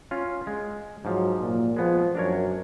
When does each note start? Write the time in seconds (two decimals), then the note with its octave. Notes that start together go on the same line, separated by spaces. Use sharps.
0.11 C#4 F4
0.47 G#3
1.05 G#2 F3 F#3
1.40 A#2
1.76 F3 G#3 B3
2.15 F#2 D4 A#4 C#5